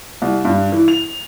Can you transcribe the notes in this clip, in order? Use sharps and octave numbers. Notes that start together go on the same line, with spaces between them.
C2
G2
E3
F7